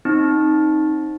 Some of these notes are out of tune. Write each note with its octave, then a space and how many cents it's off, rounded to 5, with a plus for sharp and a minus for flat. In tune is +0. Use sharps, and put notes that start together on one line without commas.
C4 +30 D#4 +0 C#6 -20